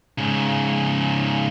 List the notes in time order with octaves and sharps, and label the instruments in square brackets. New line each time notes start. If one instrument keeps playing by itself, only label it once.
[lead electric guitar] G#2 C#3